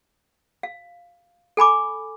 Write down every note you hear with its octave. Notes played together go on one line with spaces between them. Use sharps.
F5
A4 G#5 B5 D6